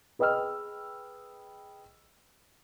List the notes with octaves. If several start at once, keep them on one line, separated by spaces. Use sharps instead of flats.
G#4 B4 D#5 G5 E6 F6